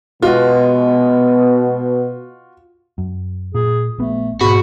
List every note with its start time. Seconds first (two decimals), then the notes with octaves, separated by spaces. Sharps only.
0.22 B2 G#3 F4 F#4
2.98 F#2
3.55 A#2 G#4
3.98 A#1 A3 B3
4.41 G#2 B2 B3 F#4 B5